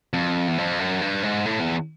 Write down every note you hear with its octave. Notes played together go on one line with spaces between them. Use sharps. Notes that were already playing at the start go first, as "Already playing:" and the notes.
F2
E2
F2
F#2
G2
G#2
A2
E2